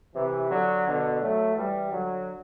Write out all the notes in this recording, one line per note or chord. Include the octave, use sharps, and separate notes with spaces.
C3 E3
D3 F#3
B2 D3
F#3 A3
E3 G3
D3 F#3